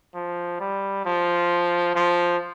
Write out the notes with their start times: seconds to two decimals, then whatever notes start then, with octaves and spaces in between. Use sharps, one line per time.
0.15 F3
0.60 G3
1.05 F3
1.95 F3